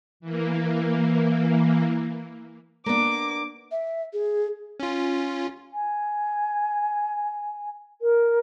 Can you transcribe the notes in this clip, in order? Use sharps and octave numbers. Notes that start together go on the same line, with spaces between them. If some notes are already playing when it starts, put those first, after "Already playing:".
E3 A#3
A#3 B3 D4 D6
E5
G#4
C#4 F4
G#5
A#4